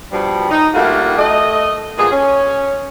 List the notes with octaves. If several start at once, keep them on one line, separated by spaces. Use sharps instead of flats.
G2 B2 F3 G3
D#4
G2 G3 A3 A#3 F4 F#4
A3 D#5
A#2 F3 B3 G#4
C#4